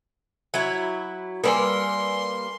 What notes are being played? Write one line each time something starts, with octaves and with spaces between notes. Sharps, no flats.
F#3 E4
G3 A#3 A#4 B4 D5 G#5 C6